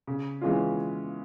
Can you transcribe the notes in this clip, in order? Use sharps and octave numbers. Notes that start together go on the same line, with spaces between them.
C#3
E3 G#3 C#4 F4